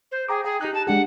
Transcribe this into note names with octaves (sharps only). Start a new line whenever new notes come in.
C5
G#4 G5 A#5 D6
G#4 G5
D#4 G4 F#6
A5
G#3 D4 G4 F#5